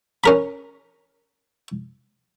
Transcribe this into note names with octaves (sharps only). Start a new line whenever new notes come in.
C#4 A#4 B5